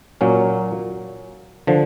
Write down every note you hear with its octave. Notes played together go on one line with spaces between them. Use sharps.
A#2 F#3 A#3 C#4
D3 F3